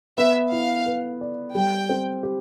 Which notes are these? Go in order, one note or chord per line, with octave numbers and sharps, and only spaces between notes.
B3 E5
E4 F5
B4
D5
G3 G5
C4
G4